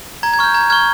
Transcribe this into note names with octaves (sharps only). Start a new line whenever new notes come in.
A#5 G#6
G#6
C#6 F6 G6
A#5 G#6
C#6 F6 G#6